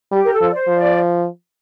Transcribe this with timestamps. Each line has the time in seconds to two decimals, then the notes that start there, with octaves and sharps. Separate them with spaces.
0.12 G3 G4
0.24 A#4
0.33 A4
0.41 F3
0.51 D5
0.54 C5
0.68 F3
0.76 D5